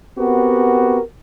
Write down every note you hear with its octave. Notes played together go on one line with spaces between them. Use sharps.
B3 C4 F#4 G4 A#4 B4